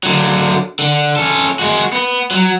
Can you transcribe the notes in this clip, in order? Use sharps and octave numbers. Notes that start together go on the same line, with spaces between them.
D3 F#3
D3
C#4 A4
G#3 F#4
B3
F#3